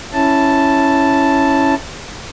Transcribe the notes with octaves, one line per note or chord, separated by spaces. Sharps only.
C#4 E4 A5